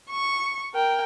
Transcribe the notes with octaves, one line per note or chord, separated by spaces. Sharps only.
C#6
A#4 G5